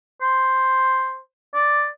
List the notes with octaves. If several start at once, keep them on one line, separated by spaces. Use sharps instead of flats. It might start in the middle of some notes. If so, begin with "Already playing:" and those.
C5
D5